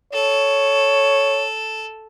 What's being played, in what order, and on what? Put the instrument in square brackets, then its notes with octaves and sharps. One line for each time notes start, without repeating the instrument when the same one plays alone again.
[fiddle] A4 [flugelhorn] C#5